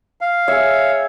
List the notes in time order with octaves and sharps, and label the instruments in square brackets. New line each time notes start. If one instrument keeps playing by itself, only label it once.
[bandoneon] F5
[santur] G#4 E5 [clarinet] C#5